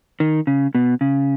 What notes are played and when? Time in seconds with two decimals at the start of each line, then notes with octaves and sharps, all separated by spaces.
0.20 D#3
0.47 C#3
0.75 B2
1.01 C#3